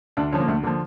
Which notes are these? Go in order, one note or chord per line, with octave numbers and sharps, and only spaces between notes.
D2 D4
D3 F3 C#4
A#3
D2 A3
D3 F3 A#3